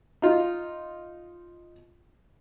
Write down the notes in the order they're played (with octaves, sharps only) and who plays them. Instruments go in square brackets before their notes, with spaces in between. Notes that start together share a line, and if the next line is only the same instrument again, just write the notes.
[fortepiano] D#4 F4